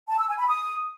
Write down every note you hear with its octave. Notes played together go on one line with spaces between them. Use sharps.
A5
E6
G#5
B5
D#6